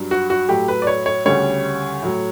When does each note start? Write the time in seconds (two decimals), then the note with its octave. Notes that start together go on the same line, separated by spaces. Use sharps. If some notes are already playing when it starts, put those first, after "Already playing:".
Already playing: G2 F#3
0.11 F#4
0.30 F#4
0.49 A2 F#3 G4
0.68 B4
0.82 D5
0.87 C#5
1.06 C#5
1.25 D2 C#3 G3 C#5
2.02 A2 F#3